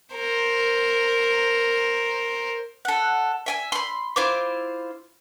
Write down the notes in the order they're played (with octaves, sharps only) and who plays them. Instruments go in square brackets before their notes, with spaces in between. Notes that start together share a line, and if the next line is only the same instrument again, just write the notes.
[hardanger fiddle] A#4 C5
[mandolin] A4 F#5
E5 G5 G#5
B5 C6
E4 F4 C5 D6